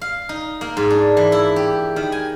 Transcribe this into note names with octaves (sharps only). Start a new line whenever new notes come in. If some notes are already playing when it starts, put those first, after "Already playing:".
F5
D#4
A#3
G#2
D4
E3
E4
G4
D#3
G#5